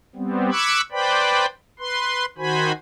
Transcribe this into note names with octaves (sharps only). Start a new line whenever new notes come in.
G3 B3 C4
B5 C#6 D6 E6 F#6 G#6
B4 C5 D5 G5 B5
B4 C6
D#3 F#4 C5 G#5 B5